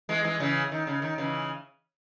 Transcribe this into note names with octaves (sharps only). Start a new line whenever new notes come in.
E3 G#3
E3 G#3
C#3 E3
D#3
C#3
D#3
C#3 E3